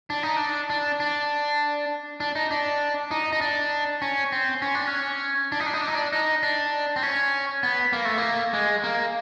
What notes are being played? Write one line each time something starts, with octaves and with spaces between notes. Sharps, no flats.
D4
D#4
D4
D4
D4
D4
D#4
D4
D#4
D#4
D4
C#4
C4
C#4
D4
C#4
D4
D#4
D4
D#4
D4
D#4
D4
D#4
D4
C4
C#4
B3
A#3
A3
A#3
G#3
A#3